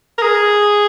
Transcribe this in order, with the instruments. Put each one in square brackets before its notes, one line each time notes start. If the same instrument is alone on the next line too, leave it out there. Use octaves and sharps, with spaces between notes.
[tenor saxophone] A#4
G#4